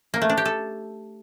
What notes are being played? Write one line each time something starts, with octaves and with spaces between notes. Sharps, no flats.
A#3
A3
D4
G4
A4